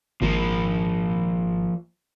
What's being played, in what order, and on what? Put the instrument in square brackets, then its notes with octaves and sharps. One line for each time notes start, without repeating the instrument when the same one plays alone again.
[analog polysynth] G#1 [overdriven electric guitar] F3 A#3